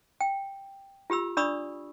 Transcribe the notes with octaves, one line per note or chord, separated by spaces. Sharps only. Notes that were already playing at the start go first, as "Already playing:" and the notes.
G5
F4 G4 B5 E6
D4 D5 B5 C#6 D#6 E6